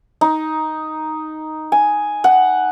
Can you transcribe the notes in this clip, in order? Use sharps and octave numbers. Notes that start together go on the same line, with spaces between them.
D#4
G#5
F#5